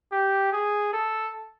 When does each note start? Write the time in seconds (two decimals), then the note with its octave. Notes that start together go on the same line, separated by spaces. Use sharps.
0.12 G4
0.52 G#4
0.93 A4